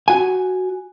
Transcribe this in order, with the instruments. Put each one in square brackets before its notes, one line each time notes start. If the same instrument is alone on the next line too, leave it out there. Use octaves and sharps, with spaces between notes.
[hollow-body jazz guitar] F#4 G#5